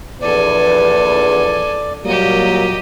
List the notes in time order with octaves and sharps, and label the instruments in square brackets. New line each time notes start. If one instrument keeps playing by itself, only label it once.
[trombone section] A#1 E2 [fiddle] A4 G#5 [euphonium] B4 [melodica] D5
[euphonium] A#2 [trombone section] F#3 G3 A#3 [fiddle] G4 D#5